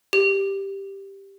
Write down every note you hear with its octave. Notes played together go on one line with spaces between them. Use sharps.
G4